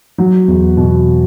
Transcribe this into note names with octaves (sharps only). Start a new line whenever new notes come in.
F#3
E2
B2